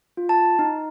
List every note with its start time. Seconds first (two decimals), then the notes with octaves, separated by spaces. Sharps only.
0.17 F4
0.29 A5
0.59 D#4